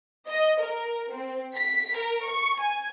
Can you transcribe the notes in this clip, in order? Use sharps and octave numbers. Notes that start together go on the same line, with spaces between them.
D#5
A#4
C4
B6
A#4
C#6
G#5